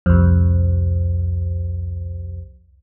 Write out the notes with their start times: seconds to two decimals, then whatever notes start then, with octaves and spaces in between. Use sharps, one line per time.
0.06 C2 F2